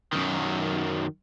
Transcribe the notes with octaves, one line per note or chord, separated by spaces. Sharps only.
F#2 D#3